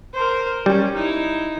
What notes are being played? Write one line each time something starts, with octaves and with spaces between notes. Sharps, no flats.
A#4 C5
G3 C#4
D#4 E4